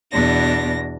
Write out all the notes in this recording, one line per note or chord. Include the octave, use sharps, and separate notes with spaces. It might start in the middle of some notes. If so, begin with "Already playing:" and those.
E2 B2 D4 A#6